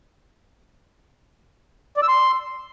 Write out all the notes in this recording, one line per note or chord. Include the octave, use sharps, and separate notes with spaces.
D5
E6
C6